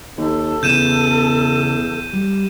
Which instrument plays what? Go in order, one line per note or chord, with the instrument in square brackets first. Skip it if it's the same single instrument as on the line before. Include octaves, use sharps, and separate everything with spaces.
[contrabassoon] D#2 [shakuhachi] A4
[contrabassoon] E2 [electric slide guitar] C#3 B3 [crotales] G6 D#7 E7
[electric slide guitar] G3